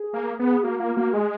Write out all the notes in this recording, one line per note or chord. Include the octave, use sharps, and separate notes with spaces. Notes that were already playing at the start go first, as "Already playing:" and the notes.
Already playing: G#4
A#3
B3
A#3 F#4
A#3 F4
A#3 F#4
G#3 G#4